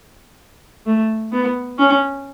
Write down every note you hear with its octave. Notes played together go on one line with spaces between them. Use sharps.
A3
B3
C#4